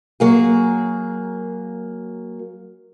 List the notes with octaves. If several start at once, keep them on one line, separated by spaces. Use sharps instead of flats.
F#3 A#3 G#4